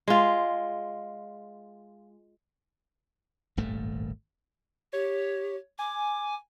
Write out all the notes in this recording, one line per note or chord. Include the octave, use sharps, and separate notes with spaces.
G#3 F4
D#1 G#1 G2 A3
G4 C#5
G#5 D6